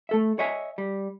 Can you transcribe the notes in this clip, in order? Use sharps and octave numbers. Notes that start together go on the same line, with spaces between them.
A3 A4 E5
C#5 D#5 E5 G#5
G3